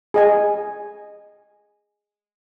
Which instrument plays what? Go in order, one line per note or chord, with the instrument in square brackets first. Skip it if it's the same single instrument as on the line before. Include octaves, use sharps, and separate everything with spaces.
[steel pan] G#4 D#5 G#5